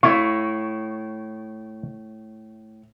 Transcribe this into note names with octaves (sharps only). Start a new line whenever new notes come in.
A2 E4 F5 C#6